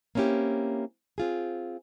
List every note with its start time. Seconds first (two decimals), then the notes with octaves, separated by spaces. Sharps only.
0.15 A#3 C4 C#4 E4 G4
1.18 C4 F4 G#4